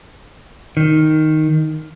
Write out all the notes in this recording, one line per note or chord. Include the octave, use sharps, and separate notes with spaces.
D#3